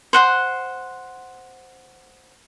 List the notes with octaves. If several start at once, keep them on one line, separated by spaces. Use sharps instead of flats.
C5 F#5 C6